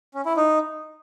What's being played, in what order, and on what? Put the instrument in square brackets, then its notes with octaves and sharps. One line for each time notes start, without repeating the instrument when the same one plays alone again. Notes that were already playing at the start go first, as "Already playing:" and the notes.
[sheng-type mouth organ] C#4
E4
D#4